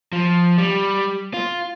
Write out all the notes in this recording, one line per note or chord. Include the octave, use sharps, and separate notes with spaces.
F3
G3
F4